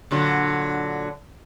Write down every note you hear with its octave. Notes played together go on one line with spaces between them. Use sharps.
A#2 D3 F#3